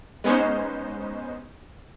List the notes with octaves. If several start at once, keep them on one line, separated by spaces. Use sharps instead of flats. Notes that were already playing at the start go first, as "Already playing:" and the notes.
G#3 B3 C#4 D#4 C5